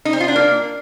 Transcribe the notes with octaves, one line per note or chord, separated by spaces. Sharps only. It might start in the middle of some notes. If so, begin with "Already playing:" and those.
D#4
C4
F4
D4
A#3